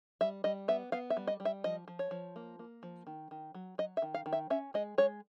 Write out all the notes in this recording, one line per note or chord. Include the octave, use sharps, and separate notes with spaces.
G3 E5
G3 D#5
B3 E5
B3 F5
E5
G3
D#5
G3
E5
F3 D#5
F3
C#5
F3
A#3
A#3
F3
D#3
D#3
F#3
F#3 D#5
E5
D#3
F5
D#3
E5
C#4 E5
G#3 D#5
G#3 C#5